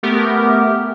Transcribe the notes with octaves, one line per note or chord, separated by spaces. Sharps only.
A3 B3 G4 A#4